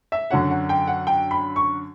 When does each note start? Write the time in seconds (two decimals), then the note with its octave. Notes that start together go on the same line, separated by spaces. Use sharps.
0.12 E5
0.31 F#2 D3 F#3 C#4 F#5
0.50 F#5
0.69 G5
0.87 F#5
1.07 G5
1.31 B5
1.56 C#6